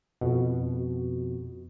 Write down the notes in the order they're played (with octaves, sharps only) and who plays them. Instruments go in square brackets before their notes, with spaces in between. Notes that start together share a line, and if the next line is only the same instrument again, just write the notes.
[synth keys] F2 B2